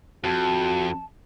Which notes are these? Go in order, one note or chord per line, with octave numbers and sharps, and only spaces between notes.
F2 F#4 A5